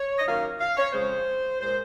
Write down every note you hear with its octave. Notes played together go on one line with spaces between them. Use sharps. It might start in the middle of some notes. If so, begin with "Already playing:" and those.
Already playing: C#5
D#5
F#2 D#3 A#3 F5
F5
C#5
F2 C#3 G#3 C5
A#2 G#3 C5